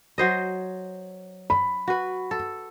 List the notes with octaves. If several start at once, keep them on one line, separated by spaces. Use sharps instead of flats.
F#3 C5 D#5
B5
F#4 B4
A4